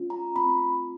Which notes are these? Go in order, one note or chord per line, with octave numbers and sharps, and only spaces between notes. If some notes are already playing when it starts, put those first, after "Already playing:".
Already playing: A3 C#4 F4
A#5
A3 C4 F4 B5